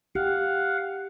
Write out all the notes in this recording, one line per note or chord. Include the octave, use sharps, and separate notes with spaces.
G4 F5 F#5